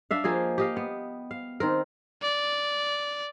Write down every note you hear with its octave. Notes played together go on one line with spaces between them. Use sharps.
D4 E5 F5
F3 A#3 G#4 D#5
G4 D#5 F5
B3
F5
D#3 C4 A#4
D5